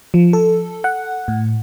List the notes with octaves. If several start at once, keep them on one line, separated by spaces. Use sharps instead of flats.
F3
A4
F#5
A2